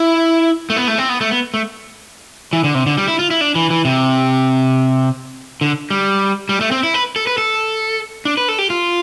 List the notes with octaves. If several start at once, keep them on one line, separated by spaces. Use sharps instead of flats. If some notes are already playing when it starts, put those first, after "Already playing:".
Already playing: E4
A3
B3
A3
C4
B3
A3
B3
A3
E3
D3
C3
D3
G3
E4
F4
E4
D4
E3
E3
C3
D3
G3
G3
A3
C4
E4
B4
A4
B4
A4
D4
B4
A4
G4
F4